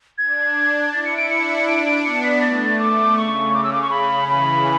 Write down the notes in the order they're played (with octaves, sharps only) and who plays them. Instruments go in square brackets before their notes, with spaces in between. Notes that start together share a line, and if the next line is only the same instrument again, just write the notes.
[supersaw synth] D4 [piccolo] G#6
[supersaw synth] E4 [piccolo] A6
[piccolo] C#7
D7
[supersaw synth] D4 [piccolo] C#7
[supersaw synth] D4 [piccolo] D7
[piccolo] D7
[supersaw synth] B3 [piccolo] C#7
[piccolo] B6
[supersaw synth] A3 [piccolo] A6
[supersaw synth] A3 [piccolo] D6
[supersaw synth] C#3 [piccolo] C#6
[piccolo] D6
E6
D6
C#6
[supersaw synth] C#3 [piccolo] B5
[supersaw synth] E3 [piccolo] B5